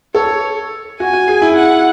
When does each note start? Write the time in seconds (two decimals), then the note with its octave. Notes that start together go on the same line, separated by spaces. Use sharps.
0.15 A4 C#5
1.00 F#4 G#5
1.13 F#4
1.28 G#4
1.42 E4
1.56 F#5